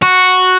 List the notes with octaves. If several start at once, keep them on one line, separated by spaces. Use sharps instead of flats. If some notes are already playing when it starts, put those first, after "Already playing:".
F#4